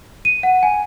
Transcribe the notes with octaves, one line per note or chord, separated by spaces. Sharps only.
D#7
F#5
G#5